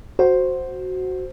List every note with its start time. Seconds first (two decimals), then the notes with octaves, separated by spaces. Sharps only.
0.19 F#4 C5